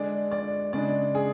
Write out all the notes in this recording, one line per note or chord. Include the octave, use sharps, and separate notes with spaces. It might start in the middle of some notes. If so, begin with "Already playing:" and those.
Already playing: D3 G#3 D4 D5
D5
C#3 G#3 D4 D5
G#4